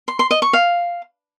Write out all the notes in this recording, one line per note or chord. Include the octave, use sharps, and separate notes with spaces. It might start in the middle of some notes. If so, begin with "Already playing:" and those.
C6
C6
D#5
C#6
F5